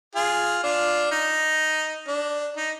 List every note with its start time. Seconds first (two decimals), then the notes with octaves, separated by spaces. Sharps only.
0.15 F4 G#4
0.63 D4 F4
1.12 D#4
2.08 D4
2.56 D#4